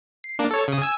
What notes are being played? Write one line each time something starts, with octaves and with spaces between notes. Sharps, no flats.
C7
A#3 D4
A4 C#5
C#3 D#6
G#5 E6